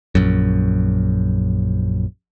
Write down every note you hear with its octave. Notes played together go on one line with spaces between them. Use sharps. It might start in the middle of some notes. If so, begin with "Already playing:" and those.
A#1 F#2